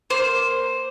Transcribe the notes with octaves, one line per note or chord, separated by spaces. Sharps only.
A#3 C5